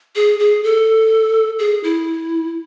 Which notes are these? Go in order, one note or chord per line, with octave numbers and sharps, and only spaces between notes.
G#4
G#4
A4
G#4
E4